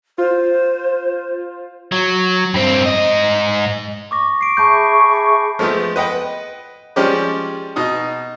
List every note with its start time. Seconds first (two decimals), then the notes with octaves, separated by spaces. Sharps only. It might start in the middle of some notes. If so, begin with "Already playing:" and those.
0.18 F4 C5
1.92 F#3
2.54 G2 C4
2.86 G#2 D#5
4.11 C#6 D6 A#6
4.41 C7 D7
4.57 G#4 E5 A5 B5 C#6 G6
5.59 F3 G#3 A3 B3
5.96 B4 D#5 F#5 G5
6.96 F3 G3 G#3 C#4 G4 D5
7.76 B2 D#4 D#6